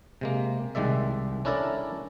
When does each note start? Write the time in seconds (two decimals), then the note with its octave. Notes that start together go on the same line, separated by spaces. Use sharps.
0.21 C3 G#3 A#3
0.75 C2 D#3 G#3 D5 E5
1.45 C#4 D4 E4 A4 A#4 D5